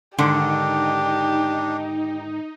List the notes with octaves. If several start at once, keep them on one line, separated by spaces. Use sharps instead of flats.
G#2 D3 D#3 D4 D#4 G4